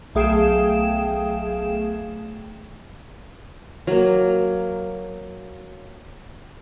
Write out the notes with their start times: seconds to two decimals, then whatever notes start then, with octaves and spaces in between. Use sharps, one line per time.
0.15 B1 A3 G#4 F5 G5 E7
3.87 F#3 A#3